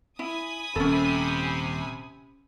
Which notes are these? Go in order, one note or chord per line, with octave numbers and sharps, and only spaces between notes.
E4 G#5 B5 D#6
D#1 C3 C#4 A4